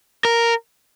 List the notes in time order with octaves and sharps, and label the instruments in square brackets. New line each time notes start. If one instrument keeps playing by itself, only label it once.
[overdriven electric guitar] A#4